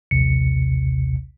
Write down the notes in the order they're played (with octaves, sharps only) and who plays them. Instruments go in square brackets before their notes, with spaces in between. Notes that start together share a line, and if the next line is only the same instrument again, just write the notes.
[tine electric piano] A#1 D#2 C3 C#7